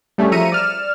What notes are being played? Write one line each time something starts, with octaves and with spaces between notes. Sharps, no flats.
G3 A3 C#4 G#4
F3 E5 A#5 C#7 D#7
D5 F6 E7